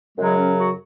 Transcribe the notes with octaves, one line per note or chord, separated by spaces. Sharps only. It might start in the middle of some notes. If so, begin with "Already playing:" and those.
F#2 C#3 F#3 G#3
C#4
F#4